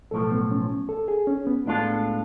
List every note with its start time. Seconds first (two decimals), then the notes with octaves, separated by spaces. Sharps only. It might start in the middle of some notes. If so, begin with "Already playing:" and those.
0.11 B1 A2 F3 A4
0.31 B3
0.51 C#4
0.89 A4
1.08 G#4
1.27 C#4
1.47 B3
1.66 A2 G#3 D4 F4 A4